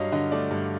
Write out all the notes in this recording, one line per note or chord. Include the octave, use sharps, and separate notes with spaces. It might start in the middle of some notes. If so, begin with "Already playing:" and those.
Already playing: G2 F#3 D#5 F5
D3 D#5
A3 D5
G2